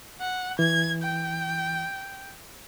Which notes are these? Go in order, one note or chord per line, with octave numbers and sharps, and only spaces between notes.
F#5
E3 G#6
G5